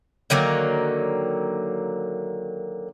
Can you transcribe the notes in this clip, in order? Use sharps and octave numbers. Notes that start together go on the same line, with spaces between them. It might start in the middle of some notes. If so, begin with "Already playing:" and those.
D3 D#3 F#3 A#3